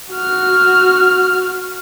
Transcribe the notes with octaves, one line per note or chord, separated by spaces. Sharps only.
F#4 F6